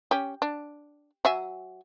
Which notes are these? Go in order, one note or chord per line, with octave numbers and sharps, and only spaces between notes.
C#4 G4
D4
F#3 E5 G#5